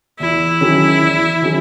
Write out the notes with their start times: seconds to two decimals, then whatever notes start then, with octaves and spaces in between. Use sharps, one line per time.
0.20 E2 E4
0.61 D#3 F#3 C#4 G#4
1.02 E2
1.42 D#3 F#3 C#4 G#4